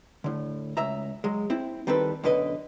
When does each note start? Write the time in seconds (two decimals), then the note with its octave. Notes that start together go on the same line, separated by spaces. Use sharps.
0.24 A2 D3
0.77 C#2 E5 A#5
1.24 F#3 G#3
1.50 C4 E4
1.87 D#3 G3 C4 A4 B4
2.24 F#2 B2 D3 B4 D#5